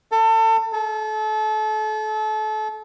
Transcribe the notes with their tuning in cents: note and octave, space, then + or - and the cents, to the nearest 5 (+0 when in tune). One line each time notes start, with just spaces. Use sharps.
A4 +30
A4 -35